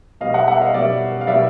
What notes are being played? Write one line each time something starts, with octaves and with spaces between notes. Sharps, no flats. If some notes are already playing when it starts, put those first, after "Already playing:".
B2 G3 D#5 F5
E5 F#5
E5 F#5
D#5 F5
B2 G3 D5 E5
F5
B2 G3 D5 E5